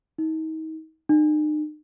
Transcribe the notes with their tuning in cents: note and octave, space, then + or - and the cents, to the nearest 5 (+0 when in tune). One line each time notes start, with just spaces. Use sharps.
D#4 +35
D#4 -40